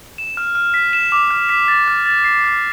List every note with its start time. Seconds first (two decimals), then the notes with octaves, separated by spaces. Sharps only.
0.18 E7
0.37 F6
0.55 F6
0.74 B6
0.93 E7
1.12 D6
1.31 F6
1.49 B6
1.68 A6
1.87 F6
2.06 A6
2.25 C7
2.44 F6